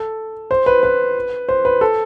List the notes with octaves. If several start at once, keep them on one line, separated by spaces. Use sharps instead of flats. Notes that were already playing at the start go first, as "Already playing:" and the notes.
Already playing: A4
C5
B4
B4
C5
B4
A4